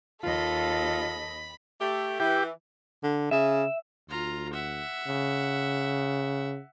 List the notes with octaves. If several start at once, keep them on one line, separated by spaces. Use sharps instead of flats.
D#2 F4 A4 D#5 B5
A3 G4
E3 G4
D3
C#3 E5
D2 F4 A#5
E5 F#5
C#3